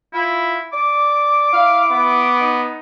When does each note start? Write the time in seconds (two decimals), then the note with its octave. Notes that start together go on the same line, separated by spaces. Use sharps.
0.13 E4 F4
0.73 D5 D6
1.53 E4 F5
1.91 B3
2.40 D#4